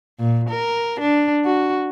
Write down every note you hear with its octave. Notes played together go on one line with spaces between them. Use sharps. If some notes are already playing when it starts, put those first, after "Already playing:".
A#2
A#4
D4
F#4